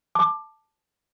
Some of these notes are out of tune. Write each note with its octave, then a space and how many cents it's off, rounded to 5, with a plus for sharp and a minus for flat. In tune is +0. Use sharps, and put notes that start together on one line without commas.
A5 +0 D6 +20